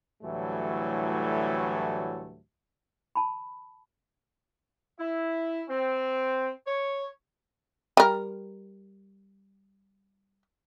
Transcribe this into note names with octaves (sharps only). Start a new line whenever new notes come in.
D2 A2 E3 F#3 G3 A3
A5 B5
E4
C4
C#5
G3 A#4